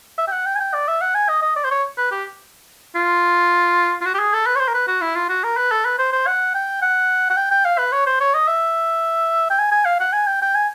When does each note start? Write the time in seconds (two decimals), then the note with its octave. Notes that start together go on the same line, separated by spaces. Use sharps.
0.18 E5
0.28 G5
0.32 F#5
0.46 G5
0.56 G#5
0.61 G5
0.74 D5
0.88 E5
1.01 F#5
1.15 G#5
1.29 D#5
1.42 D#5
1.56 D5
1.65 C5
1.71 C#5
1.98 B4
2.12 G4
2.96 F4
4.02 F4
4.05 F#4
4.14 G4
4.19 G#4
4.34 A4
4.47 B4
4.56 C#5
4.60 C5
4.68 A#4
4.75 B4
4.88 F#4
5.02 E4
5.16 F4
5.29 F#4
5.44 A#4
5.57 B4
5.72 A4
5.85 B4
5.99 C5
6.13 C5
6.27 F#5
6.55 G5
6.82 F#5
7.30 F#5
7.37 G5
7.51 G5
7.65 F5
7.78 B4
7.93 C#5
8.07 C5
8.21 C#5
8.34 D#5
8.48 E5
9.50 G5
9.59 G#5
9.72 G#5
9.85 F5
10.00 F#5
10.13 G#5
10.27 G5
10.42 G5
10.55 G#5